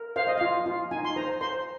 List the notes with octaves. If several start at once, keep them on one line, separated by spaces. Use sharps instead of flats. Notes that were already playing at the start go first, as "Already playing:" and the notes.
Already playing: A#4
C5 F5
D#5
F4 F5
F4
D#4 G#5
C6
C5 A#5
C5 C6